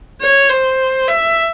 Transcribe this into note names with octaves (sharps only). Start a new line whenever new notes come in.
C#5
C5
E5